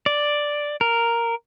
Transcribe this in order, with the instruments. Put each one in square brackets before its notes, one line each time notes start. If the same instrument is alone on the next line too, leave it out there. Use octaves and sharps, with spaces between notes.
[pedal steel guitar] D5
A#4